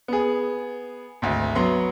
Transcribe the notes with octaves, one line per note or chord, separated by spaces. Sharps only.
B3 G#4
G#1 D2
F#3 B3 C6